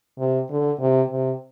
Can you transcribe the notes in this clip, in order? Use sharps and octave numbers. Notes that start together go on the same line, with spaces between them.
C3
D3
C3
C3